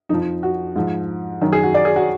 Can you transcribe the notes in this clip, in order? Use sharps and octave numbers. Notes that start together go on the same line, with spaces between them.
F2 F3 D#4
F#4
G#2 F3
F#2 D#3
G#4
F#4
D5
G#4
F#4